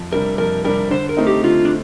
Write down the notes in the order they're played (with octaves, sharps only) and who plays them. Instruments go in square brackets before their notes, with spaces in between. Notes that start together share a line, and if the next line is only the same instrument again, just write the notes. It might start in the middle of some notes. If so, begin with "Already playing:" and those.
Already playing: [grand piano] F2
[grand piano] C3 G3 D4 [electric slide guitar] A#4
[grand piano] F2 [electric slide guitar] A#4
[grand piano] C3 G3 D4 [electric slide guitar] A#4
[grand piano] D3 [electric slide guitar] C5
[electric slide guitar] A#4
[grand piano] A3 C4 D#4
[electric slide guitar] G4
[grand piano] D3 [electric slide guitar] F4
[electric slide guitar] D4